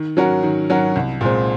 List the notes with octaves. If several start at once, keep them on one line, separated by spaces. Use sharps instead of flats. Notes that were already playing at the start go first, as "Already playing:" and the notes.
Already playing: D#3
F#3 C#4 F#4 A#4
D#3
F#3 C#4 F#4 A#4
C2
A#2 G#3 C4